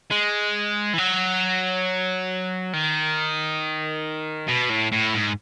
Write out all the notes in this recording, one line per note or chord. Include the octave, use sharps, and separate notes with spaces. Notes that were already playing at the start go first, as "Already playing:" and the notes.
G#3
E3
F#3
D#3
B2
A2
A2
G#2